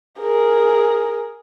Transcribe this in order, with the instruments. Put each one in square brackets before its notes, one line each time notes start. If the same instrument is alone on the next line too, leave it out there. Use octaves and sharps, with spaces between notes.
[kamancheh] G#4 A#4